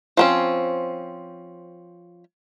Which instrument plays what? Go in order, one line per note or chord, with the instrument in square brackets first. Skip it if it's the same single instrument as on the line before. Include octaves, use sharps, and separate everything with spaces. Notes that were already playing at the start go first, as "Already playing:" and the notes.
[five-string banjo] F3 C4 C#4